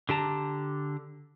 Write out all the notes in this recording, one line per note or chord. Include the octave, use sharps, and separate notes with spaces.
D3 G4 A5 A#5